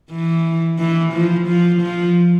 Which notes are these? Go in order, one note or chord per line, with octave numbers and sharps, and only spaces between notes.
E3
E3
F3
F3
F3